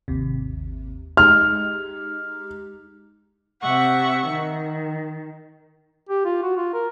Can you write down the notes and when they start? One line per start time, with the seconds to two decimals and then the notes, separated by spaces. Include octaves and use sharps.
0.08 G#1 D#2 C3
1.17 G#3 D#4 G4 F6
3.61 C3 E5 F#5 C#6
4.28 D#3
6.09 G4
6.25 F4
6.43 F#4
6.57 F4
6.74 A#4